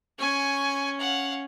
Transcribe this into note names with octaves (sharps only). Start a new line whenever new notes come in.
C#4 G#5 C#6
F5 F#5